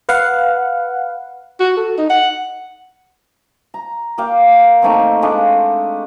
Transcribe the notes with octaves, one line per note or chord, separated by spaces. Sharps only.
B4 F5 F#5
F#4
A4
D#4
F#5
A#5
A#3 D5 F5 G5
D#3 A3 A#3 C4
G#3 A3 D4 F4